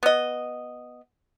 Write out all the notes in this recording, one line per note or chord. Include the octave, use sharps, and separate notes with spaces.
B3 D#5